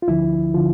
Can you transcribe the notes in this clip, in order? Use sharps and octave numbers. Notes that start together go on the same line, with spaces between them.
F4
D2 D3 F3 E4
D3 F3 F4